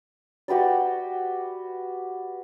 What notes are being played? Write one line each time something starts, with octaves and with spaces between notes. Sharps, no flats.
F#4 G4 B4 D5